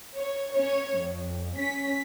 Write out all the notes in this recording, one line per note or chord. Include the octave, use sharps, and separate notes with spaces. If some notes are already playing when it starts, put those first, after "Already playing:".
C#5
C#4 C#5
F2
C#4 B6